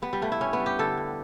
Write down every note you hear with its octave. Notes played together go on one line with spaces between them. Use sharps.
G3 B3
G3
G2 A3
E4
G3 C#4
B3
G3
G4
D3 A4
G2